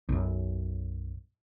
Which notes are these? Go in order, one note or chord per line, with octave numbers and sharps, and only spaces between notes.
B1 F#2